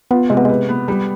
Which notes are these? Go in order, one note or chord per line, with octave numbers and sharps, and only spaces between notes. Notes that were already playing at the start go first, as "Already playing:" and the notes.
B3 F4
C3 G#3
B3
G#3 B4
B3
G3